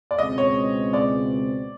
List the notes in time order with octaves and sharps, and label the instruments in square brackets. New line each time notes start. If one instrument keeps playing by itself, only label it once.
[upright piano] D5
[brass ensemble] C#2 B2 G#3 C4 [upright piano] D#5
[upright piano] C#5
D5